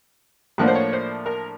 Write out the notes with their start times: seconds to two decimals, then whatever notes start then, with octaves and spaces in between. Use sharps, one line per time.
0.58 A2 F3 A#3 D4 F#5
0.68 C5
0.75 C#5
0.93 C5
1.26 A#4